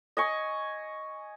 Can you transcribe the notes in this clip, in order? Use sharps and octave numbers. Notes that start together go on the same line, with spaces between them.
D#5 G#5 C#6